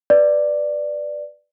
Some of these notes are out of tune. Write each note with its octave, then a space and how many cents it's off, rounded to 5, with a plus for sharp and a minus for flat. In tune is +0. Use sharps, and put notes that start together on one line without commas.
B4 +0 D5 +5